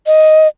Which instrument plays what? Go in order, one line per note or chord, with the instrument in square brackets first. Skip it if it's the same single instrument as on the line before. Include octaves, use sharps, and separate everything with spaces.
[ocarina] D#5